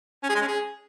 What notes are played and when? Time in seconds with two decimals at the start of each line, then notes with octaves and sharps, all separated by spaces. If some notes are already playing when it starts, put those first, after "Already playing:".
0.23 C#4
0.29 G#4
0.36 G#3
0.42 C#4
0.48 G#4